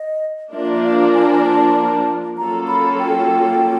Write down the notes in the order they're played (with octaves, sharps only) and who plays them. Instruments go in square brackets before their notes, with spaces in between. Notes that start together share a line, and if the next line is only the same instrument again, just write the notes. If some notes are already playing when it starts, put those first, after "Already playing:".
Already playing: [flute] D#5
[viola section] F3 A#3 D4 F4 A#4 [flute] E5
[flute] E5
F5
G#5
A5
G#5
A5
[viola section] F#3 A#3 C#4 F4 A4 [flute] A#5
[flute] B5
G5